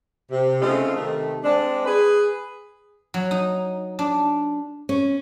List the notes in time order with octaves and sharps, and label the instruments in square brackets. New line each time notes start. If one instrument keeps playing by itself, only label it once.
[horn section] C3
C#3 A3 C4 D#4 F4
C3 D#3 A3
G#3 C4 D4
G#4 B4
[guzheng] F#3
D#4
D4
[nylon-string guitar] C#4